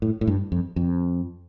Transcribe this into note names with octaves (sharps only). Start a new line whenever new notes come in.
A2
A2
G2
F2
F2